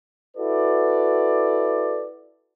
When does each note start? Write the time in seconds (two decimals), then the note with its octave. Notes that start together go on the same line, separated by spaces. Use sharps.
0.37 E4 F#4 A4 B4 D5